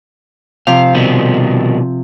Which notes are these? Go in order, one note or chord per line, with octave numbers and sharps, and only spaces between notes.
C3 F3 F5
B2 D#3 G3